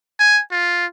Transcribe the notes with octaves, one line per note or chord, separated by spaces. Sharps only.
G#5
F4